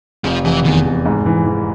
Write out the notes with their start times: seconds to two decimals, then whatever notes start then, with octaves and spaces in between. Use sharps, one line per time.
0.24 F1 F3
0.45 F1 E3
0.64 E2 D#3
0.85 F1
1.06 G#2
1.26 E3
1.46 E3